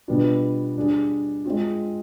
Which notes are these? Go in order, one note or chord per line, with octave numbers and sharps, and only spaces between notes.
B2 G3 B3 D4 F4
G3 D4 G#4
G#3 C4 F4